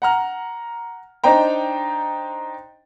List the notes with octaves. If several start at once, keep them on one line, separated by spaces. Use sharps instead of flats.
F#5 A#5 F6
D4 D#4 C5 D#5 G5 A#5